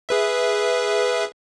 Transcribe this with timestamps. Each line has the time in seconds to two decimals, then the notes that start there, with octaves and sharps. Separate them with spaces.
0.09 G#4 B4 E5